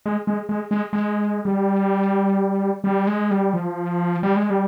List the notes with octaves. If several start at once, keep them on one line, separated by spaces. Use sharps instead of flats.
G#3
G#3
G#3
G#3
G#3
G3
G3
G#3
G3
F3
G3
G#3
G3